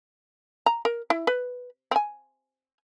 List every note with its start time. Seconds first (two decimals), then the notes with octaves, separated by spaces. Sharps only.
0.66 A#5
0.85 A#4
1.10 E4
1.27 B4
1.91 C4 G#5